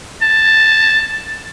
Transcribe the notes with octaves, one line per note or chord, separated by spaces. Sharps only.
A5